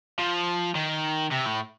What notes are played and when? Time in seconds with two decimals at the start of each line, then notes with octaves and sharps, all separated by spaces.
0.19 F3
0.75 D#3
1.31 C3
1.46 A2